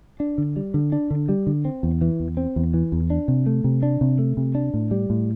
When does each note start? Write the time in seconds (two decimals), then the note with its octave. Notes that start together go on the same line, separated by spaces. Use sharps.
0.20 D4
0.38 D3
0.56 G3
0.74 D3
0.92 D4
1.11 D3
1.29 G3
1.47 D3
1.65 C4
1.83 E2
2.01 E3
2.20 E2
2.37 C4
2.56 E2
2.74 E3
2.92 E2
3.10 D4
3.28 C3
3.46 A3
3.64 C3
3.83 D4
4.01 C3
4.19 A3
4.37 C3
4.55 D4
4.74 A2
4.91 G3
5.10 A2